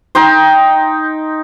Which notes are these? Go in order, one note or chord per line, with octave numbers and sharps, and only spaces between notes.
D#4 G5 C6